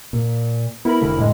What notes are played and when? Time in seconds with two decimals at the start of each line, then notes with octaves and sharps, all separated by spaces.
0.13 A#2
0.85 B3 E4 A#4 B5
1.01 F1 D3 A3
1.18 A2 G#3